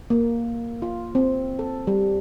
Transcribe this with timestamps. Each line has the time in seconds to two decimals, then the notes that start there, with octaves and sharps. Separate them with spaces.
0.10 A#3
0.82 F4
1.15 C4
1.59 A4
1.87 G3